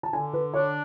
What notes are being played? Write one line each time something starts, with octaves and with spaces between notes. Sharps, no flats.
A5
D3 G#5
B4
D4 C#5